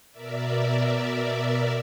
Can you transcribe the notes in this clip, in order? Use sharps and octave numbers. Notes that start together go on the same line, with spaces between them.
B2 A#4 D5 E5